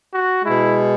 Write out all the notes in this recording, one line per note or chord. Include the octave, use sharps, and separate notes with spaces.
F#4
B2 G#3 E4